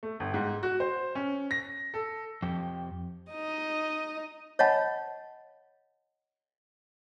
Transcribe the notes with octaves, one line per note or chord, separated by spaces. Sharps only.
A3
G1
G#2
F#4
C5
C#4
A#6
A4
F2 G4
D#4 D#5
C#5 D#5 F5 F#5 A5 B5